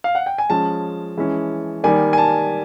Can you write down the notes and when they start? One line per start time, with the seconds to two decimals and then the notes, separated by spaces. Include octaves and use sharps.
0.04 F5
0.15 F#5
0.26 G5
0.38 G#5
0.50 F3 G#3 C#4 A5
1.17 E3 G#3 C#4
1.84 D#3 G3 A#3 G#5
2.13 G#5
2.18 A5